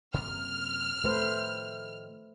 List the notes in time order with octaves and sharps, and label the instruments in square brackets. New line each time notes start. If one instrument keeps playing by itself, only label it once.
[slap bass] F#2 C3 A#3 [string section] F6
[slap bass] A2 D#3 F3 [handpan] A3 B4 C5